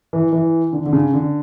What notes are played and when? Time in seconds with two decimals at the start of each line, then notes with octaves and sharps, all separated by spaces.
0.13 E3
0.33 E3
0.73 D3
0.86 D3
0.93 C#3
1.13 D3